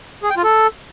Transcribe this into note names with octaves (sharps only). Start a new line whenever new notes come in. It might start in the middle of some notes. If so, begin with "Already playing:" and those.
G#4
G5
F4
A4